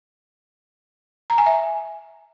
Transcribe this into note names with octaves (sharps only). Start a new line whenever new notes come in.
A#5
G#5
E5